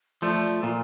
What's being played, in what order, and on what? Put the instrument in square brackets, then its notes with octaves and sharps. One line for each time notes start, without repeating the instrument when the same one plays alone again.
[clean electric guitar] F3 A3 [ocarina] D5
[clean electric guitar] A#2